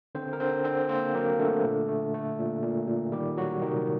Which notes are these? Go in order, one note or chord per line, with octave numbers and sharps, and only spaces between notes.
D3 C4 C5
A#4
D3 C4 C5
D3 C4 C5
A#3 C4 C5
F#3 A#3 A#4
D3 A3 A4
A#2
A3
A3
A#2
A#2
A#2
D#3 G3 G4
F#3 F#4
C3 D#3 D#4